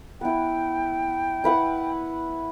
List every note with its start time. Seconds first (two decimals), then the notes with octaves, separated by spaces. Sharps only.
0.21 B3 E4 G5
1.44 E4 B4 F#5